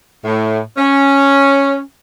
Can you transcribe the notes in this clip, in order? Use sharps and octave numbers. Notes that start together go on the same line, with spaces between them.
A2
C#4